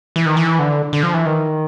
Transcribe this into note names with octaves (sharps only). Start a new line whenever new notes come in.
E3
D#3
E3
D3
D3
F3
E3
D#3